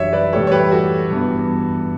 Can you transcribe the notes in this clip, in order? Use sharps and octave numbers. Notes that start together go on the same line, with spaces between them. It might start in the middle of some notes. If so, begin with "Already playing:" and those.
Already playing: F#2 E3 G3 D4 C#5 E5
B4 D5
A2 E3 G3 A4 C#5
C#5
G4 B4
F#4 A4
G2 E3 B3